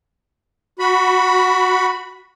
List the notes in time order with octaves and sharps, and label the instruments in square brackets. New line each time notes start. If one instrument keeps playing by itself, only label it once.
[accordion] F#4 B5